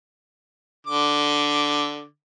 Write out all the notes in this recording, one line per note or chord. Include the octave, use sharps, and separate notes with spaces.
D3 D6